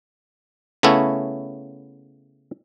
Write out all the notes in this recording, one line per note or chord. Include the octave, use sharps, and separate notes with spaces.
C#3 A3 B3 C#4 E4